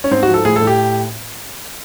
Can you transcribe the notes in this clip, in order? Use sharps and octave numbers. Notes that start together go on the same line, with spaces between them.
C#4
G#2 C4
F#4
F3
A4
A2 G#4
A4
A2
G4